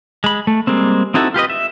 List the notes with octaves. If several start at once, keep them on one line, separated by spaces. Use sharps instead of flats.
G#3 B5
A3
G3 G#3 A#3 C4
C4 D#4 E4 F#4 A4
F4 G4 B4 D#5
E5